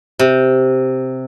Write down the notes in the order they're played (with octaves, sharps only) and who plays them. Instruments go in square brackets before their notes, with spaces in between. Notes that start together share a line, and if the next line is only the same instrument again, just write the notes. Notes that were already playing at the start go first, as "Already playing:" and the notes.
[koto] C3